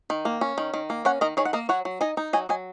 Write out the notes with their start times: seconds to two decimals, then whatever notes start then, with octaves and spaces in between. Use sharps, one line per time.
0.10 D#3
0.25 A#3
0.41 C#4
0.58 D#3
0.74 D#3
0.90 A#3
1.05 C#4 C#5 F#5
1.21 D#3 A#4 D#5
1.37 D#3 G#4 C#5
1.45 F#5
1.53 A#3 A#4 D#5
1.69 F#3 C#5 F#5
1.85 F#3
2.01 D#4 D#5 G#5
2.17 D#4
2.33 F#3 D#5 G#5
2.49 F#3 D#5 G#5